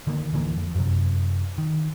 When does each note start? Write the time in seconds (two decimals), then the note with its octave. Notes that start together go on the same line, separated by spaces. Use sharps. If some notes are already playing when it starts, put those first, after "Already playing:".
0.07 D3 D#3 A#3
0.33 D1 D3 E3 A#3
0.57 F2
0.75 F#2 C3
1.58 D#3